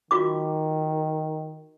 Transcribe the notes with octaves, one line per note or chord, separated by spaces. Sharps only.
D#3 F4 F#4 D6